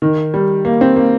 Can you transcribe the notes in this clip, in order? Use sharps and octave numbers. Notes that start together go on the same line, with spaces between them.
D#3
G3
A#3
C4
A#3